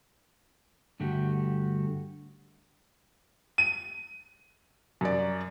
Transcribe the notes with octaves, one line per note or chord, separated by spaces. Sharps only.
G2 D3 A3 F#4 G4
D#7
F#2 D5